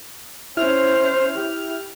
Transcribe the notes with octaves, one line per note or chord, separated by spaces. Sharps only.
C#4 E4 C5 F6
G4